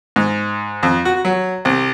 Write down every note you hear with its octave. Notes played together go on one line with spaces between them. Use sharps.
G#2
F2
F#4
F#3
C2